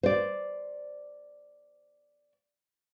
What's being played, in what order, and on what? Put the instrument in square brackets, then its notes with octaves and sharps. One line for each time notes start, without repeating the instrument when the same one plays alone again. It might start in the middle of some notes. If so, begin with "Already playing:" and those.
[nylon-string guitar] C5 D5